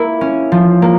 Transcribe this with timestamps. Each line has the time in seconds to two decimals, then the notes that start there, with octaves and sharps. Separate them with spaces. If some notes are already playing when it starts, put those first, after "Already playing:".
Already playing: A#3 E4
0.21 C#4
0.52 F3
0.82 A#3